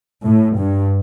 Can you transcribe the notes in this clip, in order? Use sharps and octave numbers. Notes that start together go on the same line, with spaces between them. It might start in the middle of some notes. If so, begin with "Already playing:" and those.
A2
G2